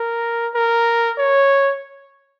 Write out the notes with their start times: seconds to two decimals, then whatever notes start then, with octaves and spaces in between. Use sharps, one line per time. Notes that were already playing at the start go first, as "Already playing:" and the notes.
Already playing: A#4
0.55 A#4
1.18 C#5